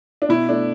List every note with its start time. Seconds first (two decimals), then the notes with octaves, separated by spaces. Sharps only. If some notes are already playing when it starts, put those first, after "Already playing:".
0.22 D4
0.29 B2 E4
0.49 A3 D4